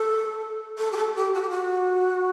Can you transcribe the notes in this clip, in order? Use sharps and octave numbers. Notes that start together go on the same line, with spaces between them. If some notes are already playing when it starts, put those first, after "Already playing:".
Already playing: A4
A4
G4
A4
G4
F#4
G4
F#4